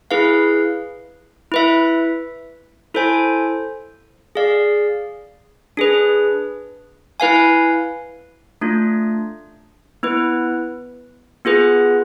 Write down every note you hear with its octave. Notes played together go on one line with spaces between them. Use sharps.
E4 G#4 B4 F5
E4 B4 E5
E4 A4 C5 G#5
G#4 D5 F5
D4 G#4 B4
E4 B4 F5 G#5
A3 D4 F4
B3 E4 B4
B3 F4 G#4 B4